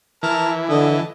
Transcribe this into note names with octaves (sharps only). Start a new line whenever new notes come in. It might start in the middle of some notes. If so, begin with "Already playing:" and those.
E3 A#4 A5
D3 D#5 A5